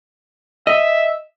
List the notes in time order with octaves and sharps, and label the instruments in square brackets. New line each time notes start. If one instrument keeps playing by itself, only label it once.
[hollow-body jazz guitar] D#5 [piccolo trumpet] E5